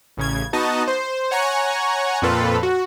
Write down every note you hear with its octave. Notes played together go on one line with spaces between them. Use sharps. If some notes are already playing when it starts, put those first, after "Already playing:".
A1 C#3 G#6
B3 D#4 F#4 D#5 A5
C5
C#5 F#5 G#5 A#5 C#6
F2 A#2 C4 F4 A4 B4
F#4